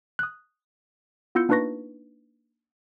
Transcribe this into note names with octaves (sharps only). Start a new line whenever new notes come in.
D#6 F#6
B3 E4 F4 E6 G6 C#7
A#3 D4 D#4 B4 C#6 A#6